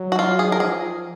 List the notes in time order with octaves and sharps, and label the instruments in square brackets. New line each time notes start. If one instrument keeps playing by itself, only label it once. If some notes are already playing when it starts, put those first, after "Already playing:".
Already playing: [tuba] F#3
[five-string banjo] F#4
F4
G#4
A#4
[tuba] F3 [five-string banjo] G#4